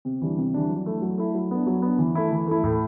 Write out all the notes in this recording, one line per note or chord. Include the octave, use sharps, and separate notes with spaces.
C3
E3 G3 D4
C3
E3 G3 D4
F#3
A3 E4
F#3
A3 E4
F#3
B3 D4
F#3
B3 D4
E3
A3 E4
E3
A3 E4
A2